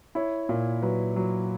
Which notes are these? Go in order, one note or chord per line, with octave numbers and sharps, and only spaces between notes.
E4 C#5
A#2
F#3 B4
F#3